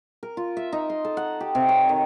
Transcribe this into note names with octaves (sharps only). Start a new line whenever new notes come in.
A#4
F4
E5
D#4
C6
A4
F#5
G4
C3
C#5
D#3